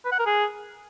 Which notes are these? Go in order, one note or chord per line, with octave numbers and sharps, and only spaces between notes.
B4
F#5
A#4
G#4